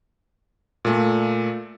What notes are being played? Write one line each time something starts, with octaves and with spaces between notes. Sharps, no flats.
A#2 A3